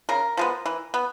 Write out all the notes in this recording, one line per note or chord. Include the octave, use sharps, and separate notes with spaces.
C#3 A#4
F3 G#3 B3
E3
B3